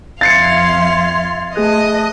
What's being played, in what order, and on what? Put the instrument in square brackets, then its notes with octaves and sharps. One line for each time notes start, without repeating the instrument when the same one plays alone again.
[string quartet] F2 F5 C6 [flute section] E5 G#6 [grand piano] A6 C7 C#7
[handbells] A3 G#4 F#6 [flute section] B4 A5 [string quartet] D#5